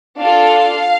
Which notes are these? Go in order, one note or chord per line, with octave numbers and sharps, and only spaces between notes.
D4 F4 A4 F5